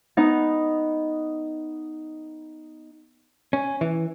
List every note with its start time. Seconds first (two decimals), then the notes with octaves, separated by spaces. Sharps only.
0.17 B3 D#4
3.53 C#4
3.81 E3